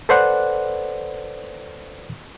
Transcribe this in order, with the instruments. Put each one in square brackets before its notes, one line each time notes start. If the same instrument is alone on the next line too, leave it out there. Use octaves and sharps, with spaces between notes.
[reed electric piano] A4 B4 C5 D5 F#5 F#6